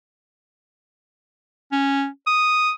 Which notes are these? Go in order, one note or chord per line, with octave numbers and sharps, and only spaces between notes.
C#4
D#6